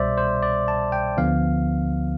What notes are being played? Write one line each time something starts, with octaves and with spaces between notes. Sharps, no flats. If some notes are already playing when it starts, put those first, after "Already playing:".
Already playing: C2 B2 G3 C5 D5 E5
C5
D5
A5
G5
D2 D3 F3 B3 F5